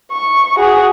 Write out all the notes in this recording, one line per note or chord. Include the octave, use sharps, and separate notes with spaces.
C#6
F#4 G#4